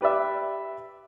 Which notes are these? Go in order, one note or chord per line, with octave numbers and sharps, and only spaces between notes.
G4 B4 D5 E5